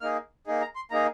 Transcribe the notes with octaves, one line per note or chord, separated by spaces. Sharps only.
A#3 D#4 G#4 F6
A#3 D#4 G#4
A#5
C6
A#3 D#4 G#4 A#5